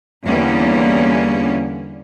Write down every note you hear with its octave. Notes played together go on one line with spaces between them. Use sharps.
E2 D3 G3 A#3 B3 C#4